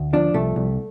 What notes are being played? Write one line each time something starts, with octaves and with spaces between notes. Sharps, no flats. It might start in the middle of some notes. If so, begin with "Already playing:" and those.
Already playing: D2
F3 D4
C2 A3
C2